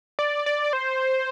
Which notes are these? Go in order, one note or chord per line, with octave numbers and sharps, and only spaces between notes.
D5
D5
C5